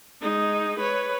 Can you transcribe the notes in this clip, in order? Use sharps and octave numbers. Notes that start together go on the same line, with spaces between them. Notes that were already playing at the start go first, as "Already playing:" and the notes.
G#3 D#4
B4 C#5